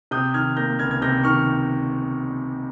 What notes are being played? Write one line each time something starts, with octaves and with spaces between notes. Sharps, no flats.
C3 D#6 G6
D#3 F6 G#6
A#3 G6 A#6
C#2 F6 G#6
G#6
C3 G6 A#6
D#3 C#6 F6